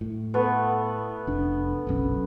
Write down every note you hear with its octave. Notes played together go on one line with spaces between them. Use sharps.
A2
A3 B3
F1 D4
F#1 B1 C#4